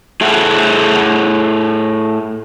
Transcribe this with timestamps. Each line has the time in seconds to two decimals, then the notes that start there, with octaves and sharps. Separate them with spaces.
0.21 A2 G#4 A4 E5 F#5